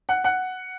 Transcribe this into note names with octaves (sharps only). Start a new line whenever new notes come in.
F#5
F#5